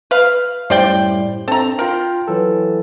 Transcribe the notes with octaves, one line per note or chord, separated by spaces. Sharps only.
B4 F5
F#2 A2 G3 C5 D5 G5
C4 D4 A4 A#5
F4 A#4 G5
E3 F#3 A4